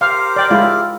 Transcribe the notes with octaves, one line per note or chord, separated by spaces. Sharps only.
G4 A#4 C5 F5
D5 G5
G#3 E4 F4